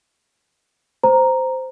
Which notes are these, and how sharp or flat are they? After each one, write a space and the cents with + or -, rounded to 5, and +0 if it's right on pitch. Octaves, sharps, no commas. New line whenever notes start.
C5 -10 A#5 +0